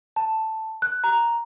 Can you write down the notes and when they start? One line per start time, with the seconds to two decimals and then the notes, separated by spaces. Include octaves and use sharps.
0.16 A5
0.82 F#6
1.04 A#5